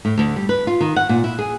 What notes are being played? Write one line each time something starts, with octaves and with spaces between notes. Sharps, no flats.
A2
D2
G3
B4
F4
D#3
F#5
A#2
E4
G#4